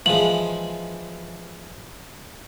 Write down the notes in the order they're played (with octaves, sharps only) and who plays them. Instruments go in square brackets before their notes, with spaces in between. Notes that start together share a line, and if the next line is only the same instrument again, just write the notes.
[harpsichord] E3 F3 G#3 [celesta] F#7